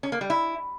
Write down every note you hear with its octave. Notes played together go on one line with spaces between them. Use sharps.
C#4
A#3
G3
E4